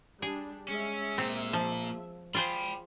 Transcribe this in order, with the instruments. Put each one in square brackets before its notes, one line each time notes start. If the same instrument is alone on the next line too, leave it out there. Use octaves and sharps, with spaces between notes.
[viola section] G3 D4 [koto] G#4
[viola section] G#3 E5 [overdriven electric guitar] C#4
[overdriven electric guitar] A#2 F4 [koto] C4
[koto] F3
[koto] F4 G#4 C5 [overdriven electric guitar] G5 B5